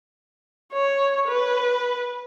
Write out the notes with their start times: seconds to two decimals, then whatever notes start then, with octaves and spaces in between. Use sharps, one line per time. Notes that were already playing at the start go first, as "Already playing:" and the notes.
0.73 C#5
1.28 B4